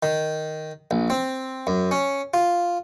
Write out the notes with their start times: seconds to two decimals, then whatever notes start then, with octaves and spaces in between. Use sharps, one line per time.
0.03 D#3
0.91 A#1
1.10 C4
1.67 F#2
1.91 C#4
2.34 F4